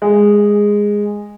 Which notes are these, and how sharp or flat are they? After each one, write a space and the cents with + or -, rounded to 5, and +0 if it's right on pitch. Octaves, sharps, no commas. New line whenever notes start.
G#3 -10